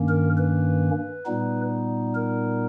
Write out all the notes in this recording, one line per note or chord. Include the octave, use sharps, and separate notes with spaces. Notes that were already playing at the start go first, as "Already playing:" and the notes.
Already playing: G2 D#3 A#3 C#4
A#4
B4
A#2 G3 B3 D#4
A#4